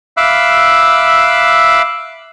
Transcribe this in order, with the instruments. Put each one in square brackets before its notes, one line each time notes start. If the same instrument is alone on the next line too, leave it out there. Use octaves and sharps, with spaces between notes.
[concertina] E5 F5 B5 D6 E6 F#6